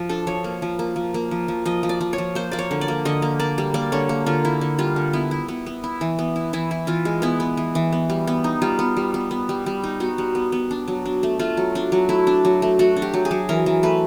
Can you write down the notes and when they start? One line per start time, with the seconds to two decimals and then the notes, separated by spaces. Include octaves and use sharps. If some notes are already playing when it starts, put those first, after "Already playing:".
Already playing: F3
0.09 D4 A4
0.27 F3 C#5
0.44 A#3
0.62 F3
0.79 A#3
0.96 F3
1.14 A#3
1.31 F3
1.48 F3
1.65 F3 D#5
1.83 F3
1.89 D5
2.01 F3
2.13 C#5
2.18 F3
2.35 A#3 C5
2.51 A#3 D5
2.59 C#5
2.71 D3
2.81 D5
2.88 A#3
3.05 D3 D#5
3.22 A#3
3.39 A#3 D5
3.58 G3
3.74 A#3 D5
3.92 D3 C#5
4.09 A#3
4.26 D3 F4
4.45 A#3 E4
4.61 D3
4.79 G3 F4
4.96 D3
5.13 B3 E4
5.31 E4
5.48 B3
5.66 B3
5.84 E4
6.01 E3
6.19 B3
6.36 E4
6.53 E3 E4
6.71 E4
6.87 E3 F4
7.05 G#3
7.22 B3 E4
7.40 B3
7.57 E3
7.75 E3
7.92 B3
8.10 G3
8.27 B3
8.44 D#4
8.62 G3 F4
8.79 B3
8.97 G3
9.14 B3
9.31 B3
9.49 G3
9.66 G3
9.84 D#4
10.00 B3 F#4
10.18 G3
10.35 B3
10.52 B3
10.71 D4
10.88 F#3
11.05 D4
11.23 A3
11.39 A3 F4
11.57 F#3
11.75 D4
11.92 F#3
12.09 A3 E4
12.27 D4
12.45 F#3
12.62 A3
12.79 A3 F#4
12.96 D4
13.02 G4
13.14 F#3
13.25 G#4
13.31 F#3
13.49 E3 A#4
13.66 E3
13.83 A3 B4